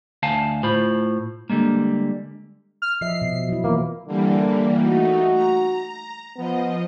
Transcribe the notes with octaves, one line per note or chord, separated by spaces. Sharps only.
D2 F5 G#5 A5
A2 F4 C5 B5
D3 G3 G#3 A#3
F6
F3 D#5 E5 C7
B2
F#3 E4
E3 A#3 B3 F4
D3 E3 G3 A#3
A3 D#4 F#4
A#5
F3 B3 D#5